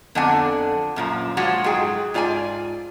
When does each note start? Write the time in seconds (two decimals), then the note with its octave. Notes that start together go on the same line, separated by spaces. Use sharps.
0.15 F2 D3 B3 D4 F#5 G#5
0.96 F#2 A#2 F3
1.37 F3 G#3 F4 F#4
1.64 G#2 F#3 G#4 G5
2.14 G#2 F4 D5 G5 G#5